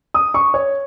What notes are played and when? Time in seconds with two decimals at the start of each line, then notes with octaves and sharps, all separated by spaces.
0.14 D#6
0.34 C#6
0.54 C#5